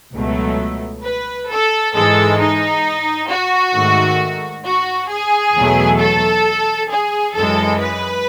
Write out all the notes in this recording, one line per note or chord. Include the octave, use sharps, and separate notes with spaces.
C#2 B2 F#3 A3
B4
A4
G#2 E3 G#3 A4
D#4
F#4
G#2 D#3 A3
F#4
G#4
E2 B2 F#3 A3
A4
G#4
F#2 E3 G#3 A4
B4